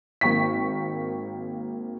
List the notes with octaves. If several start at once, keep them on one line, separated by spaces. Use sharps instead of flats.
G#1 A#3 G5 C#6 B6